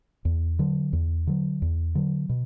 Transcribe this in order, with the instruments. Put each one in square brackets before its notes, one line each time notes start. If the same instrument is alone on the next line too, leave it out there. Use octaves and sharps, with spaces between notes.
[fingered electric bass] E2
D3 F#3
E2
D3 F#3
E2
D3 F#3
B2